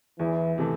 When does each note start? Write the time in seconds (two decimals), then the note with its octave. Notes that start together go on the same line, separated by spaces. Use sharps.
0.19 E2 E3
0.58 C3 E3 A3